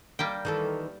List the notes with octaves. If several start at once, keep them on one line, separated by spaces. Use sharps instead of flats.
G3 A#3 G5
D#3 E3 A4